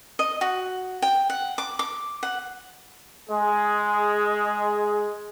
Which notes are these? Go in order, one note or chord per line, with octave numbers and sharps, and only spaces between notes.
D#5
F#4
G5
F#5
D6
D6
F#5
G#3 G#4